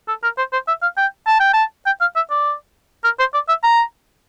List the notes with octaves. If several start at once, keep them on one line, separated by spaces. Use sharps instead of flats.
A4
A#4
C5
C5
E5
F5
G5
A5
G5
A5
G5
F5
E5
D5
A#4
C5
D5
E5
A#5